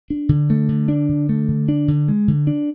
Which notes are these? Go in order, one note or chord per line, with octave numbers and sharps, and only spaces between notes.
D4
D3
A3
D3
D4
D3
A3
D3
D4
D3
G#3
D3
D4